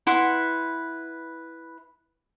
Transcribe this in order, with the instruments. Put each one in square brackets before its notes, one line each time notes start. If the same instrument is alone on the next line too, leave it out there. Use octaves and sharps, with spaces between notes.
[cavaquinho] E4 B4 F#5 C6